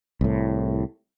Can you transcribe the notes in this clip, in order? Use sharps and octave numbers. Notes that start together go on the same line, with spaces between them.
C2 A2